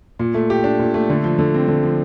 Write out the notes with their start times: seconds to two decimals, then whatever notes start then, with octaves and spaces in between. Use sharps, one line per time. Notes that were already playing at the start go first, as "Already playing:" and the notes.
0.19 A#2
0.34 A3
0.50 G4
0.64 D4
0.79 A#2
0.94 A3
1.10 D3
1.24 F3
1.39 D3
1.54 C4
1.68 D3
1.83 F3